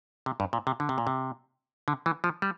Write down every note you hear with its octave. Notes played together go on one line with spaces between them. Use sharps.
C3
G2
A#2
C3
D3
C3
A#2
C3
D3
E3
F3
G3